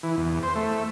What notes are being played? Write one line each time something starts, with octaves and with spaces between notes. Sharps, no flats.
E3
E2
C5
A3